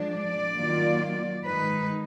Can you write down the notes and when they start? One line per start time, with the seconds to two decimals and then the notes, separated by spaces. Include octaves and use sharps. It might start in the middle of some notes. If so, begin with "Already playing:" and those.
Already playing: F3 G#3 D4
0.10 D5
0.55 D#3 F#3 A#3 F4
1.44 D#3 G#3 D#4 B4